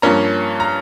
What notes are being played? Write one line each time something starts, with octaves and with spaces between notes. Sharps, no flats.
G2 F3 A#3 C#4 A#5
A#5